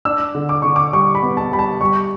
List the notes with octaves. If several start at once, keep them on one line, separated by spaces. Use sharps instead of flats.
D4 E6
D3
D6
D3 C#6
D6
G3 C#6
B5
B3
A5
G3 B5
A5
G3 C#6